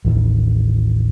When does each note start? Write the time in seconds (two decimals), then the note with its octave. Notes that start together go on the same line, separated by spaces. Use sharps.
0.05 A1 D#2